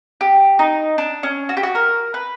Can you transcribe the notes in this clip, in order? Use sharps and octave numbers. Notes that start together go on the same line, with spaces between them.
G4
D#4
D4
C#4
F#4
G4
F#4
A#4
B4